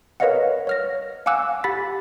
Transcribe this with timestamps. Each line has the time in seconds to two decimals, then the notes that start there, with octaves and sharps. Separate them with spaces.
0.20 A#4 B4 C#5 D#5 F5 F#5
0.67 C#5 F6 A#6
1.26 F5 F#5 G#5 D6 E6 F#6
1.64 G4 F#5 B5 A6 B6